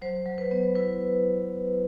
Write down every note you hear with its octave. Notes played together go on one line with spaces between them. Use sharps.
F#3 C5
F#3
B4
B3
E4 B4